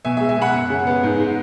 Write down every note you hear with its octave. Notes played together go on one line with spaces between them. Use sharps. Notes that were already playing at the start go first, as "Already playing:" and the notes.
B2 E5 G#5
E5 G#5
G#3
E5 G#5
B2 F#5 B5
F#2
C#3
B3
G#2
G#3